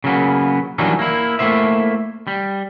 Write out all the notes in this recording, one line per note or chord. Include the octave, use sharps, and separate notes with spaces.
C#3 F#3 A#3 B3
E3 F#3 G3 A#3 D4 D#4
A#3 E4
A3 A#3 E4 C5 E5
G3